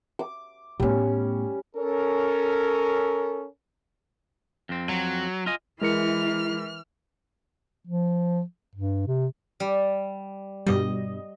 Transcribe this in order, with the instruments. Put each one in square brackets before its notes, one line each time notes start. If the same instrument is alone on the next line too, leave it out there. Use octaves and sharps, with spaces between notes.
[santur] D6
[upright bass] A2 B3 [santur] G3 C#4
[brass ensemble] C#4 A4 A#4
[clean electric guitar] F2 C4
[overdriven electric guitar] F#3
[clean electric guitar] F4 D#5 G#5
[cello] E3 [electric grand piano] G#3 A#4 C#7 [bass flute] E4 [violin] F6
[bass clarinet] F3
G2
C3
[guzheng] G3
[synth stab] G2 B2 G3 [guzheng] D#5